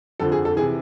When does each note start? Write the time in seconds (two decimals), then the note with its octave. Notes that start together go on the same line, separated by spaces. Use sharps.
0.20 F2 D3 F3 A4
0.32 G#4
0.45 A4
0.56 C3 E3 G#4